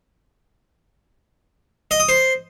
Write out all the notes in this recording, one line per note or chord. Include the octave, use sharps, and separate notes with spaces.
D#5
D#6
C5